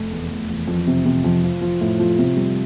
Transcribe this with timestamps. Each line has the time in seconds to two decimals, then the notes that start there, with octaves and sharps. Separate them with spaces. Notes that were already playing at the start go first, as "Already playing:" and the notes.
Already playing: F1 A3
0.11 E2
0.30 E2
0.49 E2
0.67 F2
0.87 C3
1.05 C3
1.24 F2
1.44 F3
1.61 F3
1.81 A2
2.00 F3
2.18 C3
2.37 G3